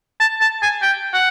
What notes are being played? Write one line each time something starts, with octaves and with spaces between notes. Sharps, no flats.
A5
A5
G#5
G5
F#5